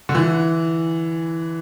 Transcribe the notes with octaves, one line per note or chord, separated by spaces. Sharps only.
D3
E3